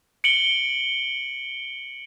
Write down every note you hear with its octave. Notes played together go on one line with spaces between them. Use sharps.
C#7 D7 F#7 G7